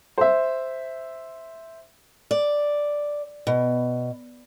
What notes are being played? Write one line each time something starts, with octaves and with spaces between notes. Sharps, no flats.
C5 E5
D5
B2